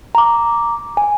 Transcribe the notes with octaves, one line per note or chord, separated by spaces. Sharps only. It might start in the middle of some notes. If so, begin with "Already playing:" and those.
A#5 D6
G#5